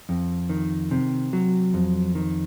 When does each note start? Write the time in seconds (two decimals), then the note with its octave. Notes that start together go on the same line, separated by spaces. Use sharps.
0.09 F2
0.49 D#3
0.91 C3
1.33 F#3
1.74 F2
2.15 D#3